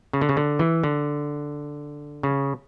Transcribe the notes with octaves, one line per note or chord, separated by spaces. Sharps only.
C#3
D3
C#3
D3
E3
D3
C#3